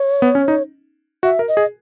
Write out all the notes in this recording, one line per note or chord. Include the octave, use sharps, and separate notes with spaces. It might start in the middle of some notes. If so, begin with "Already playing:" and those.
Already playing: C#5
B3
C#4
D#4
F#4 E5
A#4
D#5
G#4